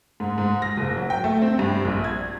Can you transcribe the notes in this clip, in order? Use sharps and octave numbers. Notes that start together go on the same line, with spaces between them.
G#2
G#2
A#6
F#1
F#3
G5
A3
C4
G2
A#1
G#6